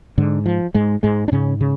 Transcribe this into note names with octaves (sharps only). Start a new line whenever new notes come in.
G#2 D3
F3
G#2 G#3
G#2 G#3
D4
G#2 C#3 C#4
C#3